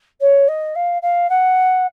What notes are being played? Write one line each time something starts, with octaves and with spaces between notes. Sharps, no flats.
C#5
D#5
F5
F5
F#5